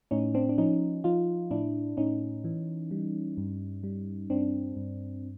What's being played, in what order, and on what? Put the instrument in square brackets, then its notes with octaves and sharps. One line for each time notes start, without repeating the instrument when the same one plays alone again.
[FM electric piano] A2 C#4 D#4
C4 D4
D4
F3 C#4 D#4
F3 D#4 F4
A2 D4 E4
A2 C#4 D#4
E3
G3
G2
G3
G2 C4 D4
G2